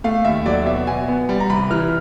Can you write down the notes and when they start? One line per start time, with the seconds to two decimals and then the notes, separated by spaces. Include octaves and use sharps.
0.04 A3 F5
0.25 D#2 E5
0.45 F#3 D5
0.66 B2 E5
0.87 B2 G#5
1.08 B3
1.29 G3
1.40 A#5
1.50 C2 B5
1.70 E3 F6